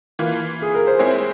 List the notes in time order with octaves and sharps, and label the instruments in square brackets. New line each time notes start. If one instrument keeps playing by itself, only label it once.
[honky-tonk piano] E3 A#3 F4
[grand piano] G#4
A#4
C5
[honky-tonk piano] G#3 C4 E4 G#4 [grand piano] C#5